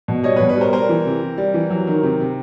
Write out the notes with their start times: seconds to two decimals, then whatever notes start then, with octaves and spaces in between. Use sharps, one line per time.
0.08 B2
0.24 G3 C#5 D#5
0.36 B4 C#5
0.40 B2
0.49 B4 C#5
0.57 G3 A#4 C5
0.73 G3 A#4 C5
0.89 E3
1.05 C3
1.22 C3
1.38 G3
1.54 E3
1.70 F#3
1.87 D#3
2.03 C3
2.20 C3